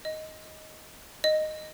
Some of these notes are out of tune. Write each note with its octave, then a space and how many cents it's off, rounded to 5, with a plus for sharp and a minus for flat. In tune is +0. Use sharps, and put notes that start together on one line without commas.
D#5 +5
D#5 -10